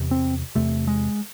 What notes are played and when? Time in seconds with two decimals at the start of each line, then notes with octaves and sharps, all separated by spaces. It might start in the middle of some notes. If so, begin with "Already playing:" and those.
Already playing: E2 C3
0.11 C4
0.55 E2 C3 A3
0.87 G#3